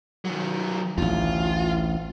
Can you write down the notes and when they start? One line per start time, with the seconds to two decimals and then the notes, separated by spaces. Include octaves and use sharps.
0.25 D#3 F#3
0.98 A1 D2 F4